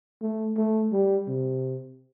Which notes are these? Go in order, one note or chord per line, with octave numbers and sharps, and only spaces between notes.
A3
A3
G3
C3